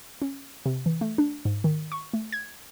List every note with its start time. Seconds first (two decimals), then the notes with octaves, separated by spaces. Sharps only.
0.22 C#4
0.66 C3
0.86 E3
1.01 A3
1.18 D4
1.45 G#2
1.64 D#3
1.92 C#6
2.13 A3
2.33 G#6